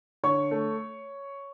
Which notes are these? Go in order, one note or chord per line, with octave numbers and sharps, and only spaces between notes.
D3 C#5 C#6
A3